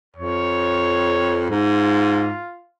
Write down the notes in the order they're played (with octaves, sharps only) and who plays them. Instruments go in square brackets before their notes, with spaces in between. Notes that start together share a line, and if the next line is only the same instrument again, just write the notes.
[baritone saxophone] F2 [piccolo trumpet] C#5
[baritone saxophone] G#2 [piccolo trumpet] F4